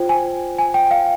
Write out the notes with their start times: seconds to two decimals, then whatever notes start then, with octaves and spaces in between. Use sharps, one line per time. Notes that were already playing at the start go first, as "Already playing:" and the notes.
Already playing: F4 C5 G5
0.09 G#5
0.59 G#5
0.74 G5
0.91 F5